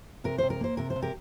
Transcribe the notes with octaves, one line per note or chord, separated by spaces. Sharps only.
C3 A#4
C3 C5
A#4
A#3 C5
C3 A#4
C5
C3
G4 A#4